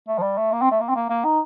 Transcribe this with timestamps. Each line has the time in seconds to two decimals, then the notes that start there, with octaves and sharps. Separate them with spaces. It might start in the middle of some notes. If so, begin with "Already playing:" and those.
0.08 A3
0.18 F3
0.22 G3
0.37 A3
0.52 A#3
0.62 C4
0.71 A3
0.80 A#3
0.89 C4
0.96 A#3
1.09 A#3
1.24 D#4